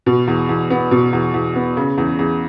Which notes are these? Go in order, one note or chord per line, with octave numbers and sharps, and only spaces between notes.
B2
E2
E2
B3
B2
E2
E2
B3
C#3
E2
E2